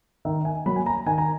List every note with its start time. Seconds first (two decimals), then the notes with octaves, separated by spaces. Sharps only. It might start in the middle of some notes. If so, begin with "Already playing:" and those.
0.25 D#3 E5
0.45 G#5
0.66 F#3 A#3 B5
0.76 G#5
0.86 A#5
1.06 D#3 G#5
1.18 A#5